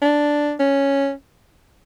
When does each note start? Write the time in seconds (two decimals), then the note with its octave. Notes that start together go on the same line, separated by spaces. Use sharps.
0.02 D4
0.60 C#4